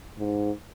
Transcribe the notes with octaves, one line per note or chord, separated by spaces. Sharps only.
G#2